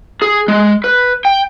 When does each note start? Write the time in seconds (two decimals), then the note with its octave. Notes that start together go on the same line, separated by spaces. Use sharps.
0.22 G#4
0.48 G#3
0.84 B4
1.25 G5